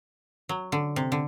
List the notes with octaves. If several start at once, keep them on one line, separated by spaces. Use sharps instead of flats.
F#3
D3
C3
D3